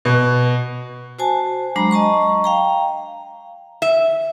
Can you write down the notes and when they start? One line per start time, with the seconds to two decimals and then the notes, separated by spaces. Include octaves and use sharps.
0.05 B2
1.19 F#4 C5 G#5 A5
1.76 F#3 G#3 D4 A#5 B5
1.91 D#5 A5 A#5 C#6
2.44 F5 G5 A#5
3.82 E5